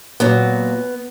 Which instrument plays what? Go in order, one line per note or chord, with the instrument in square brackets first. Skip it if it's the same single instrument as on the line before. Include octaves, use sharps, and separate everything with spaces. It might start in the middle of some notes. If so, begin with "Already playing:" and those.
[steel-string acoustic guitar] A#2 F#3 B3